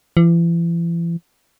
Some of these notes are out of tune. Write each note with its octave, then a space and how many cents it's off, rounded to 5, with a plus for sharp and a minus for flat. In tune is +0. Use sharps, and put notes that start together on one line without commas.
E3 +40